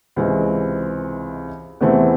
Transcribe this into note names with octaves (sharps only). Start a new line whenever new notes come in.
C#2 C3 E3 G#3 C4
E2 C3 E3 A3 C4